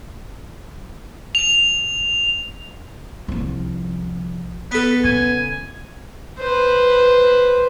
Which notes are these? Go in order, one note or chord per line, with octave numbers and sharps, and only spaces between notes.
F7
C2 F3
B3 A4 B4
C#3 G#5
B4 C5